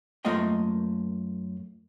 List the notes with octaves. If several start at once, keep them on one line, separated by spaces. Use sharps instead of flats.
F#2 A3 A#3 F4 D#5 G5